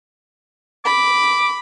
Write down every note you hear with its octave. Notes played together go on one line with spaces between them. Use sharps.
B5 D6